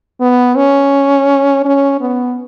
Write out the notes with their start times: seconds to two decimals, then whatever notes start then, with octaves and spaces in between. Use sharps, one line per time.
0.21 B3
0.56 C#4
1.65 C#4
2.01 B3